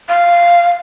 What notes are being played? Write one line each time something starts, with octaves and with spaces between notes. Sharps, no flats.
F5